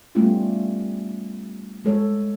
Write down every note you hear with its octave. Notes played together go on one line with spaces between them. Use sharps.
G3 A3 B3 C#4 F4 G4
G#3 A4 C#5